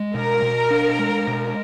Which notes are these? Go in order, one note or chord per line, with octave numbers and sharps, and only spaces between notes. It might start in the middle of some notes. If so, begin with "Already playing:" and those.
Already playing: G#3
B2 A#4
B2
D4
G#3
B2